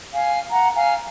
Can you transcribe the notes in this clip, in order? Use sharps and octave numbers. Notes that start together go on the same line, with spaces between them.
F5 G#5
F#5 A#5
F5 G#5